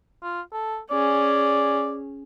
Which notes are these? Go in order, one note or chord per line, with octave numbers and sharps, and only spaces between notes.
F4
A4
C#4 G#4 D5